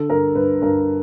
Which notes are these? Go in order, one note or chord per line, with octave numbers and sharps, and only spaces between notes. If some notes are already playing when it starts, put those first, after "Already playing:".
Already playing: D3 A4
G2 A#4
G2 B4
G2 A#4